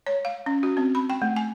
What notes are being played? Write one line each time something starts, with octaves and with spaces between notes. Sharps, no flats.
C#5
F5
C#4
F#4
C4
B5
G5
A3
G#5